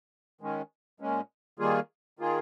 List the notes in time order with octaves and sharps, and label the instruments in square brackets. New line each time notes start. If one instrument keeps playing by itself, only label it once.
[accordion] D#3 G#3 C#4
A#2 G#3 C#4
D#3 G3 A#3 F4 G#4
D#3 A#3 F4 G#4